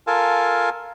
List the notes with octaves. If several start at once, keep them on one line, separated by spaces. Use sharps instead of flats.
F4 A4 A#4 F5 G#5 A5